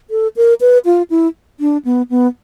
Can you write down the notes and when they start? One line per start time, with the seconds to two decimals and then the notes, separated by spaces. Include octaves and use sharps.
0.10 A4
0.36 A#4
0.61 B4
0.85 F4
1.10 E4
1.60 D4
1.85 B3
2.10 B3